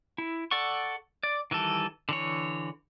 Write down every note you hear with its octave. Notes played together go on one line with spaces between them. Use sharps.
E4
A4 D5 F#5 C#6
D5
D#3 E3 G3 A4
D3 E3 C#5